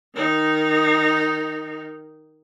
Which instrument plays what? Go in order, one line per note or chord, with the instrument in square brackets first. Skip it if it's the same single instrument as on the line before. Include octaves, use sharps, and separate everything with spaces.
[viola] D#3 D#4